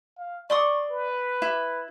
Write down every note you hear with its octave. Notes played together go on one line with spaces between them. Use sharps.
F5
D5 C6 C#6 D#6
B4
E4